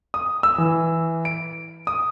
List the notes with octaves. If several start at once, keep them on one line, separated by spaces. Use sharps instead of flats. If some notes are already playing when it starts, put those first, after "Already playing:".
D#6
E6
E3
D7
D#6